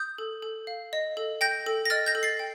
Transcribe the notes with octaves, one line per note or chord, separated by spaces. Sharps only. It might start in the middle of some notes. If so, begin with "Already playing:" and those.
Already playing: D#6 G6
A4
A4
F5
D#5
A4
G5 G6 A#6
A4
A#6
D#5 F6 A6
G6 A#6
A4
A6 C7
G5